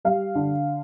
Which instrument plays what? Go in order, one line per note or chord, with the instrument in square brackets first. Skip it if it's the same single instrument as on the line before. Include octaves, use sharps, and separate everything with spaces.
[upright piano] G3 F5
D3